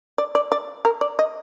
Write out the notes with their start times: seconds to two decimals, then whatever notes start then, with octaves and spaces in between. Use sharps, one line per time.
0.18 D5
0.35 D5
0.52 D5
0.85 A#4
1.01 D5
1.19 D#5